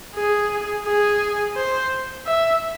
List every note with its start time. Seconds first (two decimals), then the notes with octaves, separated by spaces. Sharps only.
0.15 G#4
0.85 G#4
1.56 C5
2.26 E5